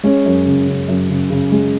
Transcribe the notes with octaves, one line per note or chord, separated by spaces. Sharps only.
G#3 C#4
F#2
C#3
C#3
F#2
C#3
C#3
G#3